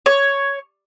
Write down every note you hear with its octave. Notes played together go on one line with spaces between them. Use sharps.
C#5